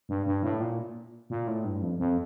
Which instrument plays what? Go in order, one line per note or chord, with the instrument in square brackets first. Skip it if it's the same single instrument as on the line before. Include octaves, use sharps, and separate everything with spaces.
[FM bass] G2
G2
A2
A#2
A#2
A2
G2
F2
F2